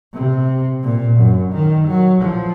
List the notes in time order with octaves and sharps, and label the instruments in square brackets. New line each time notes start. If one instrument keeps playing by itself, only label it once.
[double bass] C3
A#2
F#2
D#3
F#3
F3